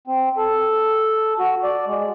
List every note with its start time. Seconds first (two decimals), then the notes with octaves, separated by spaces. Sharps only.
0.07 C4
0.37 A4
1.39 F#4
1.63 D5
1.87 G#3